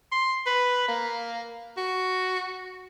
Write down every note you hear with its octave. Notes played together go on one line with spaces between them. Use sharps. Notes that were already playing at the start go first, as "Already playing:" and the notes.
C6
B4
A#3
F#4